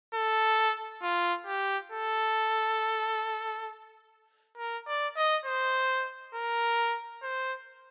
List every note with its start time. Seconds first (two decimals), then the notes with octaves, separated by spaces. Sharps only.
0.15 A4
1.03 F4
1.47 G4
1.92 A4
4.58 A#4
4.87 D5
5.17 D#5
5.46 C5
6.35 A#4
7.23 C5